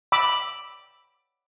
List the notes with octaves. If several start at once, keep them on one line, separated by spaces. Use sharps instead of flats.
B5 D6 E6